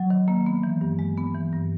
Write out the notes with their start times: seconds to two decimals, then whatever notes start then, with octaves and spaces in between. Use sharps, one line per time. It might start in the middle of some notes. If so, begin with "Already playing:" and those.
Already playing: F#3
0.10 D#3
0.28 A#3
0.46 B3
0.64 E3
0.81 G2
0.99 G#3
1.17 B3
1.35 E3
1.53 G2